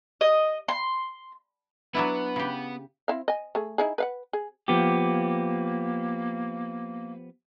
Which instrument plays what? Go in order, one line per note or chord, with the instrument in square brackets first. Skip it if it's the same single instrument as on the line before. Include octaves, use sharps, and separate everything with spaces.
[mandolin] D#5
C6
[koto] F#3 D4 E4 [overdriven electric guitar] B3 [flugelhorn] B4
[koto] C#3 G4
[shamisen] C4 E4 F5
D#5 G#5
A3 G#4
D#4 E4 G#4
B4 F5 F#5
G#4
[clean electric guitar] F3 B3 G4 [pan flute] A#3